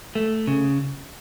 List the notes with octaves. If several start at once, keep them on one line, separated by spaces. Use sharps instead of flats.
A3
C#3